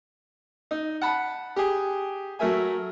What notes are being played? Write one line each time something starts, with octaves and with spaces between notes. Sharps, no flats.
D#4
F#5 A5 B5
G4 G#4
F#3 A3 A#4 E5 G#5